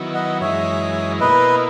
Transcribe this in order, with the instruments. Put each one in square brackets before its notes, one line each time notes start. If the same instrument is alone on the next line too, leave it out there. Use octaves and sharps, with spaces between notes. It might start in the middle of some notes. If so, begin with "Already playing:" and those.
Already playing: [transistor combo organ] D#3 F#3 B3 E4
[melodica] D#5 F#5
[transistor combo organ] F#2 E3 G#3 D#4 [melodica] C#5 E5
[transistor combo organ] B2 A#3 E4 [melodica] B4 D#5